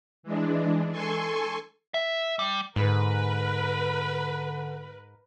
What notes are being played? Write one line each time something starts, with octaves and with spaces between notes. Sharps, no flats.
E3 G#3 D4
A4 G#5 C6 C#6
E5
G3
G#2 D3 A#4 B4